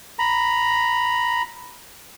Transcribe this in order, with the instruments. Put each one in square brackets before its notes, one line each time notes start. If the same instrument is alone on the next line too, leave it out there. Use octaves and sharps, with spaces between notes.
[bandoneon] A#5 B5